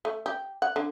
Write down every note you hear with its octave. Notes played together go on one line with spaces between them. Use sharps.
A3
G4
F#5
D3